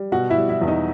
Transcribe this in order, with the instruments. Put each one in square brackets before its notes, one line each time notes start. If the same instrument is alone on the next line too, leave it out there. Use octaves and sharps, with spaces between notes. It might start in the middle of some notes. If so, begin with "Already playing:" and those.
Already playing: [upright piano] G3
B2 F#4 F#5
E4 E5
G3
E4 E5
E2
D#4 D#5